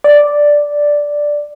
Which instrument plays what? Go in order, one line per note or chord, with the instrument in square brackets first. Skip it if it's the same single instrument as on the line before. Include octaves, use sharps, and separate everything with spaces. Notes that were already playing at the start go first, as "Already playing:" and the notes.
[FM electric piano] D5